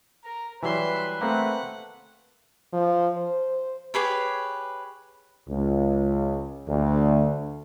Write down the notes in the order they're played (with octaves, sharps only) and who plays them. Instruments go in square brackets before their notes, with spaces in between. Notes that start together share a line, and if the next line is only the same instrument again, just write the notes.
[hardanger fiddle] A#4 [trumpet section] A#5
[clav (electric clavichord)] E3 F#3 G3 [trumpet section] B4 [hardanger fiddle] E5 C6
[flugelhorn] A3 [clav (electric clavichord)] A#3 C4 [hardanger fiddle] F#5
[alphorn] F3
C5
[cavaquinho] G4 G#4 B4 C#5
[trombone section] C#2
D2